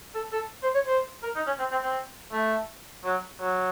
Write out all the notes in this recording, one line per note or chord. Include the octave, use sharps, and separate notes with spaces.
A4
A4
C5
C#5
C5
A#4
D#4
C#4
C4
C4
C4
A3
F#3
F#3